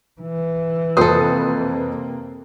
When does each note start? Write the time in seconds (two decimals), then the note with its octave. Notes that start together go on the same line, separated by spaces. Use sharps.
0.21 E3
0.97 F2 C3 A#3 C4 A4 B4 C5 D#6